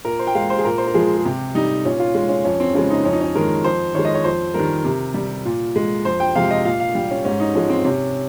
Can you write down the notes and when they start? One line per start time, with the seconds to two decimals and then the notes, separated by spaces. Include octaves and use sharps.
0.05 A#2 A#4
0.19 C5
0.27 G5
0.35 G#3 F5
0.50 C5
0.59 G#4
0.65 A#2 A#4
0.78 C5
0.87 A#4
0.94 F3 G#3 G#4
1.18 G#4
1.25 C3 G4
1.55 G3 D#4
1.85 A#2 C#4
2.00 F4
2.15 G#3
2.29 C#4
2.44 F2 C#4
2.60 C4
2.74 C#3 F3 G#3 C4
2.90 D#4
3.05 F2 C#4
3.12 D#4
3.21 C#4
3.35 D#3 G#3 A#4
3.64 F2 C5
3.95 D#3 G#3 C#5
4.05 D#5
4.15 C#5
4.24 F2 C5
4.54 D#3 G3 A#4
4.85 C3
5.14 G3
5.45 A#2
5.76 G#3
6.05 F2 C5
6.20 G5
6.35 C3 F3 G#3 F5
6.51 D#5
6.65 A#2 F5
6.80 F5
6.95 G3 G4
7.11 C#4
7.25 G#2 C#4
7.40 D#4
7.55 F3 G#3 C#4
7.70 C4
7.85 C3 C#4